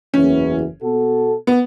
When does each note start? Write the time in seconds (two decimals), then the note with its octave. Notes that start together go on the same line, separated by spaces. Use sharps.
0.14 F#1 E2 E3 C#4
0.81 B2 B3 F#4 A4
1.47 B3